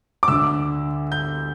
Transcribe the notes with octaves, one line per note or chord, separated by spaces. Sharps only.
D6
D2 D3 E6
G6